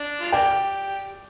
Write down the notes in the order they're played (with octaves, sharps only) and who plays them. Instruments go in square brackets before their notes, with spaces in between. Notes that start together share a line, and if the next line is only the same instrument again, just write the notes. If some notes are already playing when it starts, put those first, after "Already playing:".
Already playing: [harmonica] D4
F4
[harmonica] A#3 D4 G4 [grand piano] D5 G5